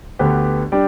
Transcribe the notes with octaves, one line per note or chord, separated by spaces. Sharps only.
D2 D3 B3 G4 B4
G3 D4 G4 D5